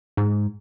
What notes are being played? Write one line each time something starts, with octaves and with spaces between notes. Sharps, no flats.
G#2